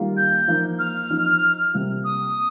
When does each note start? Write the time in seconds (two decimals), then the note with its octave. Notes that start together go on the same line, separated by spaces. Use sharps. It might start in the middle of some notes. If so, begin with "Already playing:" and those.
Already playing: D#3 G3 A#3 F4
0.17 G6
0.48 F3 A#3 D#4
0.79 F6
1.10 F3 D#4
1.73 C3 G3 A#3 F4
2.04 D#6